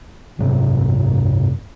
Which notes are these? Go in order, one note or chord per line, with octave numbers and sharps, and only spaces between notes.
F#1 G#2 C3 F#3